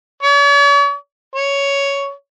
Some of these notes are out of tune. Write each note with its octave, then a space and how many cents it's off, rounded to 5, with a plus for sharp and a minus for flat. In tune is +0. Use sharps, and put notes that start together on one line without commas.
C#5 +45
C#5 +10